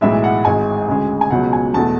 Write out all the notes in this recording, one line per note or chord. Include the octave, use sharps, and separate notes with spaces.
B1 A2 E3 G#3 E5
F#5
G#1 G#2 G#3 G#5
D2 C#3 G#3
G#5
C#2 B2 F#3 F#5
G#5
E2 B2 A3 A5